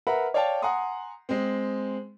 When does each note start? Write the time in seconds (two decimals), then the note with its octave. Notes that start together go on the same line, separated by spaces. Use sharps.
0.07 A#4 B4 E5 F#5 A#5 B5
0.34 C#5 D5 F5 G5 A5
0.62 F#5 G#5 A#5 C6 D#6
1.29 G#3 C4